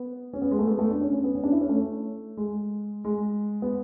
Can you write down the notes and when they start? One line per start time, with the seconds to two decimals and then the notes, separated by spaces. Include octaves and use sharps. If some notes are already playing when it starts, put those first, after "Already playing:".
Already playing: B3
0.33 C#4
0.42 B3
0.51 G#3
0.59 A3
0.67 B3
0.79 A3
0.90 D4
1.01 C#4
1.13 C#4
1.24 B3
1.35 C#4
1.44 D4
1.52 E4
1.61 C#4
1.69 A3
2.37 G#3
3.05 G#3
3.62 B3